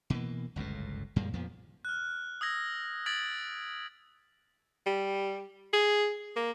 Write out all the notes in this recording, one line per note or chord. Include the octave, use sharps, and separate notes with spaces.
B2 E3 A#3
G1 C#2 F#2 A2
F#2 A#2 G3 G#3
F2 A#2 F3 B3
F6 F#6
D#6 E6 G#6 A#6
D#6 G#6 A6 B6 D7 F#7
G3
G#4
A#3